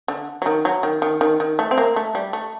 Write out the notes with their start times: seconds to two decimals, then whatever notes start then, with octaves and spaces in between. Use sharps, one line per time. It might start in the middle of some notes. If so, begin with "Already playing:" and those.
0.08 D3
0.42 F#3
0.46 D#3
0.65 F#3
0.83 D#3
1.02 D#3
1.21 D#3
1.40 D#3
1.59 A3
1.71 C4
1.78 A#3
1.96 A3
2.15 G3
2.33 A3